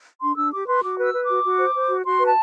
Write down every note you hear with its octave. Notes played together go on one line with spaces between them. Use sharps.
D4 C6
D4 E6
G4 D6
B4 C6
F#4 D6
B4
E6
B4
F#4 D6
F#4
C5
C5
F#4
F#4 C6
B4
A5